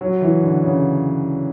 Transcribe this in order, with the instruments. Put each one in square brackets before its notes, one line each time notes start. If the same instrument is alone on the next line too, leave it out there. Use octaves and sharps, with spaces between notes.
[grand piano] F#3
E3
D3
C#3